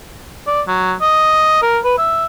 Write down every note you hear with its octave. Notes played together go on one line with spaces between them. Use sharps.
D5
F#3
D#5
A#4
B4
E5